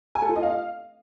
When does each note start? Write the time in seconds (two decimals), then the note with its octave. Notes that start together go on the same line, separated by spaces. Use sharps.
0.15 G#5
0.22 A4
0.29 F4
0.36 D#5
0.43 F5